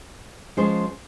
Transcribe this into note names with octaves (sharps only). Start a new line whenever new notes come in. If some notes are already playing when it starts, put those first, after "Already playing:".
F3 G#3 C#4 G#4 C5